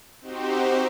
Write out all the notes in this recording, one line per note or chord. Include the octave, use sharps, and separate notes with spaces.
C4 D#4 F#4 G4 C5